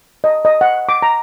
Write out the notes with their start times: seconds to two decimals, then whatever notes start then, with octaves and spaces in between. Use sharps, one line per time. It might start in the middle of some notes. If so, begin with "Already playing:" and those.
0.24 D#5
0.45 D#5
0.61 F#5
0.89 D6
1.02 A#5